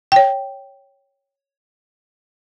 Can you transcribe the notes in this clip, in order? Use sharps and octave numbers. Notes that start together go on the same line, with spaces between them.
C#5 G5